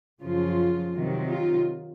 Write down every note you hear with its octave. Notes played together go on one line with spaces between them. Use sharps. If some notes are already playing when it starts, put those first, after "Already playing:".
F#2 C#3 F3 F4
C3 D#3 F#3
F4